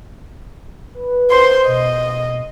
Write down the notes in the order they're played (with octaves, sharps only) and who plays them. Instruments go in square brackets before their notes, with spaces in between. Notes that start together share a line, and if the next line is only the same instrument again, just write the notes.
[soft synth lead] B4
[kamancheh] C5 C6
[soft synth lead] B2 [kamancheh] D#5